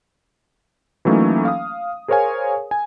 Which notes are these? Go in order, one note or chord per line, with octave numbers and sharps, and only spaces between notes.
E3 F#3 A3 A#3 C#4 D#4
F5 D#6
G#4 A#4 C5 C#5 F5 G#5
G#5